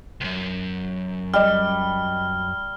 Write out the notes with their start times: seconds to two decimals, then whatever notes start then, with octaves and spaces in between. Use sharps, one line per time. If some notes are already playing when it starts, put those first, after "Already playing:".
0.21 C#2 F#2
1.34 G3 D#5 F6